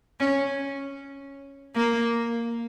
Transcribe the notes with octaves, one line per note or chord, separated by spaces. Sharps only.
C#4
A#3